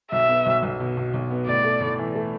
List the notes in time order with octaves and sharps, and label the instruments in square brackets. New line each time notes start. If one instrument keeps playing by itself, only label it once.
[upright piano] B1 [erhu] E5
[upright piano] B3
B1
B1
B2
B2
B1
B3
[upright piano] A2 [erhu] D5
[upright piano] A3
A2
E3
A3